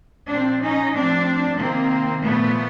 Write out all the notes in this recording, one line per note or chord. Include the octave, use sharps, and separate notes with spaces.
A#2 F3 C4 D4
C#4 D#4
A2 F3 C4 D4
C3 D#3 A#3 C4
A#2 F3 A3 B3